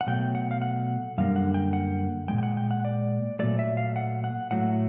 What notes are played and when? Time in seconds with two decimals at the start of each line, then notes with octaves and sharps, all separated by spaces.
0.01 F#5
0.07 B2 F#3 A3 G5
0.35 F#5
0.51 F5
0.62 F#5
1.18 F#2 D3 G3 A#3 F5
1.36 F#5
1.54 G5
1.73 F#5
2.28 A#2 F3 G#3 G5
2.38 G5
2.43 F#5
2.57 G5
2.71 F#5
2.85 D5
3.39 A#2 F#3 A3 D5
3.59 E5
3.77 F5
3.96 F#5
4.24 F#5
4.51 A2 F#3 A3 F#5